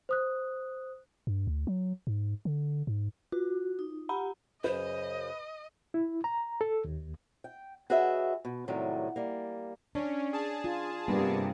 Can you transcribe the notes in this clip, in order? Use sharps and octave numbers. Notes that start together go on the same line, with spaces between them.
C5 D#6 F#6
G2
D2
F#3
G#2
D3
G#2
F4 F#4
D#4
G4 F#5 A#5 B5
F#2 C#3 B4 C5 D#5
E4
A#5
A4
D#2
G5
F#4 G#4 B4 C#5 D#5 E5
B2
A2 C3 D#3 F#3 G3
G3 A#3
C#4 D4
G#4 A5
F4
G2 C3 G3 A#3 B3 D4